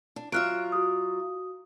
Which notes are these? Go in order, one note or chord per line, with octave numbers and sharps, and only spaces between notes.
D4
F#3 F4 E5 F6 F#6 D7
F#4 D#6